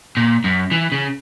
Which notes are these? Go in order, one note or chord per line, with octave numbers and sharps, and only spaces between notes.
A#2
F#2
E3
C#3